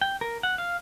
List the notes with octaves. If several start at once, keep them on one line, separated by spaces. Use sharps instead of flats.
G5
A#4
F#5
F5